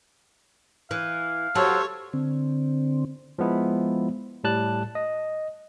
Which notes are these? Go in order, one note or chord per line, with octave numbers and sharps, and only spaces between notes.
E3 F5
F#3 G4 A4 C5 C#5 A5
D3 C4
F3 G#3 B3 E4
A2 G3 A5 F#6
D#5